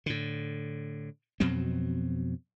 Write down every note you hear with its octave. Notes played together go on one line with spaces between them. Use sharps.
A2 D3
F2 B2 F#3 C4